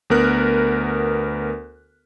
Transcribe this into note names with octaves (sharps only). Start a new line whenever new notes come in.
D2 B3 A#4 F#6